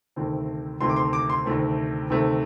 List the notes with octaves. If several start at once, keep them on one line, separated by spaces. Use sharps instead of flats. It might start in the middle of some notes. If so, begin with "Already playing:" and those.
D2 C3 D#3 A3 C4
D2 C3 D#3 A3 C4 C6
D6
C6
D6
C6
D2 C3 D#3 A3 C4
D2 C3 D#3 A3 C4